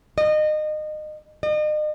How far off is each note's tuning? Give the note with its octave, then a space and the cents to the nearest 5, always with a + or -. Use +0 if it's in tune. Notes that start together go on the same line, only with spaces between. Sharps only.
D#5 -25
D#5 -40